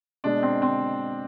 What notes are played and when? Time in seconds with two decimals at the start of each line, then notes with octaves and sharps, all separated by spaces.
0.24 B2 G#3 D4
0.43 C4
0.62 C4